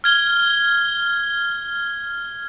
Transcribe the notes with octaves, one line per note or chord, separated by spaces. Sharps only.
F6 G#6 G7